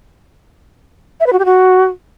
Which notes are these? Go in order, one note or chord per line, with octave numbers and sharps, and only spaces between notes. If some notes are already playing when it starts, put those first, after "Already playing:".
E5
B4
F#4
G4
F#4